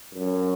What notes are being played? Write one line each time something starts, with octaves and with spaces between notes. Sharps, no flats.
F#2